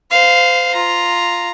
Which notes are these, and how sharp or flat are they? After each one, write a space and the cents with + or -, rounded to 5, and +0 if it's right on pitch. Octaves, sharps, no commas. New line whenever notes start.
C5 -30 F5 +0
F4 +0 A#5 +0